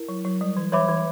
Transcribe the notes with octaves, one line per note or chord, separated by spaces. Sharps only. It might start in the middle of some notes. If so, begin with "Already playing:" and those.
Already playing: E4 A#4
F#3
F#3
G3
E3
E3 C#5 E5 B5 D6
E3